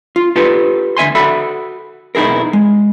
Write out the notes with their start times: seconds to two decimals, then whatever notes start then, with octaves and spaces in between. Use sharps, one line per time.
0.16 F4
0.36 F4 G4 A4 B4
0.97 D2 E5 G#5 C6
1.15 F#4 A4 E5 B5
2.15 B1 D#4 E4 G#4 A#4
2.53 G#3